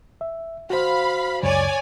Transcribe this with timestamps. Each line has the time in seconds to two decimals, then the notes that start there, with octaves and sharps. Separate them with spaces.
0.21 E5
0.70 F#4 C5 F5 B5
1.43 C#2 F#2 C#3 C#5 D5 G#5